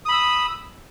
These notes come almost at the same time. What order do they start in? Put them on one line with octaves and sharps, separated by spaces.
D#6 B5 E6